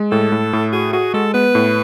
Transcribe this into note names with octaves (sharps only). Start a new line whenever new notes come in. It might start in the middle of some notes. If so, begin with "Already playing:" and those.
Already playing: G#3
A2 A4
A2
A2
F#4 G#4
F#4 G#4
G#3 A4
B3 B4
A2